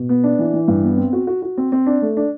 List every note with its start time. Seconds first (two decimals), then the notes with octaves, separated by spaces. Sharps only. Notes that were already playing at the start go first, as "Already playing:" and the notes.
Already playing: B2
0.09 B3
0.24 D4
0.39 E3
0.53 E3
0.68 G2
0.84 B3
0.97 C4
1.13 F#4
1.27 F#4
1.42 F#4
1.57 C4
1.72 C4
1.86 D4
2.02 A3
2.17 D4